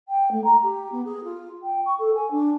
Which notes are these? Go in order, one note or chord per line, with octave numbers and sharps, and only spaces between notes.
G5
A3
A#5
G4
B3
G#4
F4
G5
C#6
A4
G#5
D4